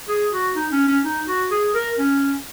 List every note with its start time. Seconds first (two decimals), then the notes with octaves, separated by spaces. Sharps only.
0.09 G#4
0.32 F#4
0.55 D#4
0.72 C#4
0.88 C#4
1.04 D#4
1.27 F#4
1.51 G#4
1.75 A#4
1.99 C#4